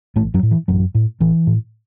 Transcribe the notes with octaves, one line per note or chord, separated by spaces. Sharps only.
A1 A2 A3
F#2 F#3
A2
E3
A1 F#2 F#3
A2
A1 E3
A2